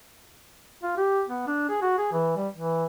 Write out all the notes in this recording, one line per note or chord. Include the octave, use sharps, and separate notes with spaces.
F4
G4
B3
D4
G#4
F#4
G#4
E3
G3
E3